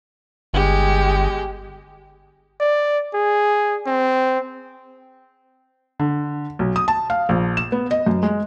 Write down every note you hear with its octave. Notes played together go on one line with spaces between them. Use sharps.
G1 G#3 G4
D5
G#4
C4
D3
B1
D#6
A5
F5
A#1
E7
B3
D#5
F#2
G#3